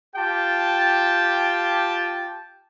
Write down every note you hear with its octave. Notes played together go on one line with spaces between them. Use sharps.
F4 G4 G5 A5